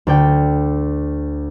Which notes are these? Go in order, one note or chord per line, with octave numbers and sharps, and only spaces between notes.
D2 D5 G5